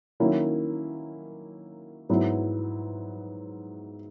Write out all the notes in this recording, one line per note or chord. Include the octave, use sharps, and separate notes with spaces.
D#3 F#3 A#3 C#4 E4
G#2 F#3 B3 E4